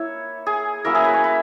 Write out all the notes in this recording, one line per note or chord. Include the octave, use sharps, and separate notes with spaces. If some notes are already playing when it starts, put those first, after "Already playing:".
Already playing: A#3 E4 C#5
G#4
F#3 A#3 C#4 E4 A#4
G#4
B4
C#5
B4